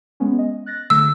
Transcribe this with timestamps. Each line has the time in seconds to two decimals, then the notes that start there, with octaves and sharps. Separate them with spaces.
0.20 G#3 B3 C#4
0.38 D#5
0.66 F#6 A6 A#6
0.90 D3 F#3 A3 E6